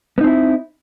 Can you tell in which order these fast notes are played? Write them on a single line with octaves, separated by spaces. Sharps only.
B3 D#4 C4 E4